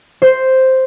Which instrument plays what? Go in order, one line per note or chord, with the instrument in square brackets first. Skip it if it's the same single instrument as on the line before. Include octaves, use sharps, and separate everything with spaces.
[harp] C5